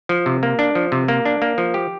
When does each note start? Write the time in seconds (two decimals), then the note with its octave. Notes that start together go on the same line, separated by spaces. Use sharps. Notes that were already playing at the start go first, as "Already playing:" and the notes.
0.09 F3
0.26 C3
0.43 A#3
0.59 D4
0.75 F3
0.92 C3
1.08 A#3
1.25 D4
1.42 A#3
1.58 F3
1.74 G4